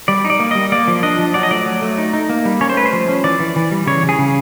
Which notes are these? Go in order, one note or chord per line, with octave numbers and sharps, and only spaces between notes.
G3 D5
D#4
D5
A#3
G3 D#5
A#3 D5
F3
D4 D#5
F3
F#3 D5
D#5
A3 D5
F#3
A3
D#4
D#4
A#3
G3
C#4 C#5
C5
A3 B4
C5
F3
C#4
E3 D5
E3
E3
G3
C#3 C#5
C#3
G#4
C#3